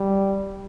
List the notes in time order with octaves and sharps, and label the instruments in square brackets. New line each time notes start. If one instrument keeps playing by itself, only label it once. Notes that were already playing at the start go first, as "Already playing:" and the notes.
Already playing: [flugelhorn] G3